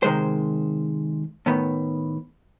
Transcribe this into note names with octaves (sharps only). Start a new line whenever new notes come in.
C3 D#3 G#3 C5
A2 D#3 B3